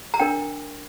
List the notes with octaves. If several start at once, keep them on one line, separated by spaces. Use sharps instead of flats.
A#5
D4 A#4 G5